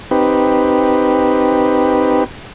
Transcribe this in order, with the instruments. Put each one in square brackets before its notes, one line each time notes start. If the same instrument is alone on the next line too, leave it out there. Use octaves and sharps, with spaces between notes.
[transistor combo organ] C4 D#4 G4 B4